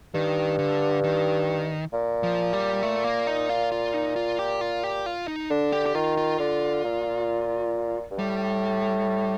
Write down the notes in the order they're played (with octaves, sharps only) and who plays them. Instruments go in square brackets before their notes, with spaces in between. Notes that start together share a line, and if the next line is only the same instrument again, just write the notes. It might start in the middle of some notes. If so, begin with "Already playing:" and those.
[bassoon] G2 [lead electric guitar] D#3
[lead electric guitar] D3
D#3
[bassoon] A#2
[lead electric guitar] F3
G3
A3
A#3
D#4
F4
F4
D#4
F4
G4
F4
G4
F4
D#4
[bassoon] D3 [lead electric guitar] D4
[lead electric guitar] G4
G4
[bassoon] D#3 [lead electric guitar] F4
[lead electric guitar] F4
[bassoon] D3
A#2
G2
[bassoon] A2 [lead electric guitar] G3